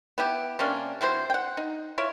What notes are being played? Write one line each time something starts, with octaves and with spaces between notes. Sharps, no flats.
B3 E4 G4
C3 A#3 C#4 D4
C3 F#3 E4 C5
F#5 G5
D#4
E4 F4 C#5